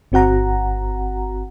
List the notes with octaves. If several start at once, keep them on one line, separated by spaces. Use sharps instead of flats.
G1 C4 F#4 F#5 A#5